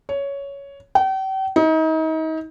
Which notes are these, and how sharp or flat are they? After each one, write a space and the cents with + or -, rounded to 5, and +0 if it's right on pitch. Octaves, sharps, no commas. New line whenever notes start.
C#5 +10
G5 -40
D#4 +35